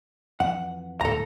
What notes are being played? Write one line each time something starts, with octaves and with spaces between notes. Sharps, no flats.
F2 E3 F#5
D1 G#2 A4 A#5